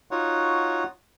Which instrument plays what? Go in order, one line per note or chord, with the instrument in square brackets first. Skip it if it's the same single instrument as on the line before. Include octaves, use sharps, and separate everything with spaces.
[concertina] D#4 F4 F#4 C#5 F#5